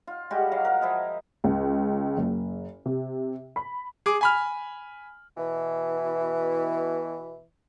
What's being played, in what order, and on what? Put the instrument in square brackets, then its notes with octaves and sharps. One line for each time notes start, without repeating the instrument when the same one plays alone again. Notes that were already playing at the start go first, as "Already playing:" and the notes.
[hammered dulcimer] F4
G3 G#3 F#4 G4
F#3 F5
A#4 F#5
F3 E4 D#5
[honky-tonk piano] C#2
F#1
C3
B5
[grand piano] G#4 D6
G#5 B5 F6
[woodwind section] B2 E3